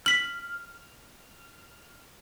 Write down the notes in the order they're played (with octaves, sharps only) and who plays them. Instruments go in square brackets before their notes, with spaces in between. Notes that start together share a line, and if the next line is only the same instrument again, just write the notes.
[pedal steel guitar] F6 [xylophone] B6 F#7